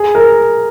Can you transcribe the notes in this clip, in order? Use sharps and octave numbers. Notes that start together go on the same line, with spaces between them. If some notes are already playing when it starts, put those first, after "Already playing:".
Already playing: G#4
A#4